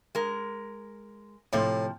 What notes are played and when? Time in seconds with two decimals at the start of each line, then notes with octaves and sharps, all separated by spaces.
0.15 G#3 A#4
1.53 A2 C3 F3